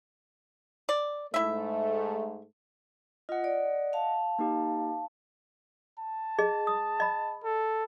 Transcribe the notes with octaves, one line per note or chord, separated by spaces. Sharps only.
D5
G#2 A3 E4 E5
F4 D#5 F#5
D5
F5 A5
A#3 D#4 G4
A5
G#4 D#5
D#6
D#5 B5
A4